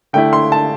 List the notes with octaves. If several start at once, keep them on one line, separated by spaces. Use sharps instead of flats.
D3 A3 E4 G5
C6
A5